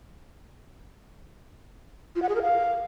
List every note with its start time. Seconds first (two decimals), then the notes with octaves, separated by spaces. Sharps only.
2.16 F4
2.22 F#5
2.29 G#4
2.35 A#4
2.42 F5